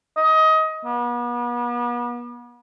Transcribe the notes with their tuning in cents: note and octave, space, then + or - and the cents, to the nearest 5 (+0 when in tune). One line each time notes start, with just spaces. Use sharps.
D#5 +20
B3 -40